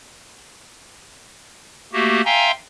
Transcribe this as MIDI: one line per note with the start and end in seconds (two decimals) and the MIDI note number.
1.93 2.21 57
1.93 2.21 58
1.93 2.21 66
1.93 2.21 67
2.25 2.51 76
2.25 2.51 77
2.25 2.51 79
2.25 2.51 80
2.25 2.51 82
2.25 2.51 84